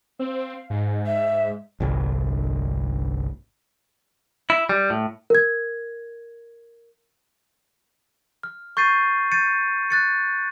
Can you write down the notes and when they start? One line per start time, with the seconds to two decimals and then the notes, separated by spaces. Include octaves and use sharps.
0.19 C4 F5
0.70 G#2
1.05 E5
1.80 G1 C2
4.50 E4
4.69 G3
4.90 A2
5.30 A#4 G#6
8.43 F6
8.77 C#6 G6 A6 C7 D#7
9.32 G6 A6 C#7 D#7
9.90 F#6 A6 C#7